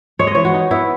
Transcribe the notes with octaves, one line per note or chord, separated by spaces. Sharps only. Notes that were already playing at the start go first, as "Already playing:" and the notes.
G#3 C#5
D#5
E3 C#5
F#4
D#4
B3 E4